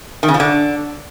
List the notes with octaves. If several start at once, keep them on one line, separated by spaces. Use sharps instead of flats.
D#3
C#3
F3
D3